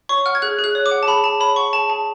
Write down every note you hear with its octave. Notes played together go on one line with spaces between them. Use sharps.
C#5 C#6
F#5 F6
G#6
G#4 F#6
G#4
F#6
C#5
D6
F#5
A5
G#4 B5
G#4 A5
C#5 B5
F#5 C#6
G#4 A5
G#4 A5